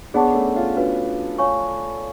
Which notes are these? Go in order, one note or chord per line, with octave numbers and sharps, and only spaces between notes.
B3 D4 G#4 C#5 F#5 A5 C#6
A3 C#4
C#4 F4
C#4 D4 F4 F#4 B4
C#5 F5 G#5 C#6